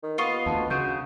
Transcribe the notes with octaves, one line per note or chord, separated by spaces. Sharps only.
D#3
B3 F4 D#5 C#6
D2 A5
C#3 F#4 G6